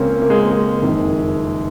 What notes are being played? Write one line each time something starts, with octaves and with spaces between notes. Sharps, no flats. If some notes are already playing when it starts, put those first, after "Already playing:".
Already playing: C#2 C#3 A#3 C4 C#4
A#3
G#3
A#3
G#3
F#1 F2 D#3